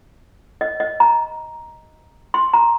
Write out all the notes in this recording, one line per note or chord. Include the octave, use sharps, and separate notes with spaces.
D#5
D#5
A#5
C6
A#5